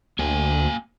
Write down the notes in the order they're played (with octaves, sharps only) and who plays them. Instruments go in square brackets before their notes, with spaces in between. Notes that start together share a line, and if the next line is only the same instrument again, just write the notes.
[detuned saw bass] D2 [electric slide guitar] A#3 G5 G#5